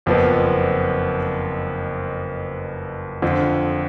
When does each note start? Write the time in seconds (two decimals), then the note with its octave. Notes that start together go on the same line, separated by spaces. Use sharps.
0.06 F#1 F2 F3 B3
3.22 F2 D3 F3